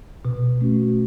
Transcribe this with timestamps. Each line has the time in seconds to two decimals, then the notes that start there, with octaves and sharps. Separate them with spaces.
0.25 B2
0.61 A3 C#4 F#4